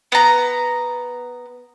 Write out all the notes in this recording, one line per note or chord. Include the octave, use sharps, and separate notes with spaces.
B3 A#5